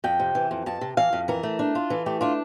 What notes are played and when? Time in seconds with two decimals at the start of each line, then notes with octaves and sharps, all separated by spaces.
0.04 F2 G5
0.20 C3
0.35 E3
0.51 F2
0.66 F2 A5
0.81 C3
0.97 E3 F5
1.13 F2
1.28 E3 A#4
1.43 A3
1.59 D4
1.75 F4
1.90 E3 A4
2.06 A3 G4
2.21 D4 F4